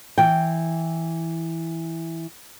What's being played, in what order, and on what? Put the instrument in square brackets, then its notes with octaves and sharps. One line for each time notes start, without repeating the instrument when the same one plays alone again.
[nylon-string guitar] E3 G5